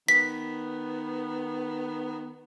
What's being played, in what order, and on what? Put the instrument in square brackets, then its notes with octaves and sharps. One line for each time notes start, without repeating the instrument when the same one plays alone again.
[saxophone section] D#3 B3 [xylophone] B6